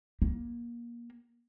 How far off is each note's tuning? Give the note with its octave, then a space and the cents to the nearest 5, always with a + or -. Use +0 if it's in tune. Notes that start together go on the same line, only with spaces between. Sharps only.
A#3 +25